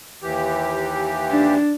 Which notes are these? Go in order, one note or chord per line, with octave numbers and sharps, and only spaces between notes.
D#2 E3 G4
D4